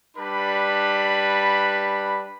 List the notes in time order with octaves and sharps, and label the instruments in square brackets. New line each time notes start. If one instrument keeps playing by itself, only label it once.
[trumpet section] G3 D4 B4 B5